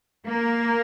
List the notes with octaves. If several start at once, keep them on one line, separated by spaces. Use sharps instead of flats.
A#3